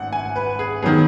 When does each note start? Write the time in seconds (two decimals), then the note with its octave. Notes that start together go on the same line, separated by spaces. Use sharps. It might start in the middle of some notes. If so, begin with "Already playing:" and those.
Already playing: G#1 F#5
0.13 G#5
0.36 B4
0.59 G#4
0.82 D#3 F#3 B3 G#4